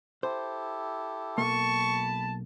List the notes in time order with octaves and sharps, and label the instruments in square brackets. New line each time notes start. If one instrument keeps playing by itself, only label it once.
[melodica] E4 G4 A4 [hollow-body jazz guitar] C5
[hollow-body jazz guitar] B1 A#3 [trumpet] A5 [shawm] C#6
[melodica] B5